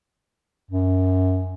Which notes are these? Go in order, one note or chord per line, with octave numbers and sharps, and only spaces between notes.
F#2